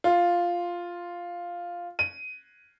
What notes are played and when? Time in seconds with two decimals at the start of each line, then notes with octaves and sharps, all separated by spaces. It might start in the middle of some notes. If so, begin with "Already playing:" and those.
0.04 F4
1.99 D#7